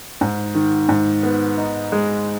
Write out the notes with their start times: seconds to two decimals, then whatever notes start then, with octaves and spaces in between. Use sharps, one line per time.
0.21 G#2
0.54 D#3
0.89 G#2
1.23 B3
1.57 D#4
1.92 G#3